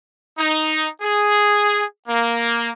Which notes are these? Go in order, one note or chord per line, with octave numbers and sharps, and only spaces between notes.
D#4
G#4
A#3